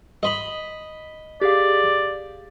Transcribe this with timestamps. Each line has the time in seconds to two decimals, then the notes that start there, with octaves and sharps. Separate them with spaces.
0.23 D#5 B5
1.41 G4 G#4 D5 F5